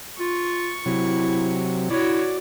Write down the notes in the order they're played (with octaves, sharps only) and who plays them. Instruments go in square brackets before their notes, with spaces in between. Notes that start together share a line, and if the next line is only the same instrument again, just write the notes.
[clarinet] F4 [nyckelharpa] C#6
[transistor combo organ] C3 F#3 [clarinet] E4
[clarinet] E4 [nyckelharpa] F#4 C#5 [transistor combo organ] D5